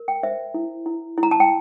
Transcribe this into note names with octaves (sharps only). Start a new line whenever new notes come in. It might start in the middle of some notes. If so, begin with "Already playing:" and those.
Already playing: A#4
G5
C5 E5
E4
E4
E4
A#5
A5
G5